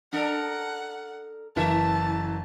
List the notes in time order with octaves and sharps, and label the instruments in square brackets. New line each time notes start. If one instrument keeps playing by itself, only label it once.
[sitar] D4 A4 A#4 [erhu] F#5
[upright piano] F#1 E3 A#4 [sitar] E4 E5 [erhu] A5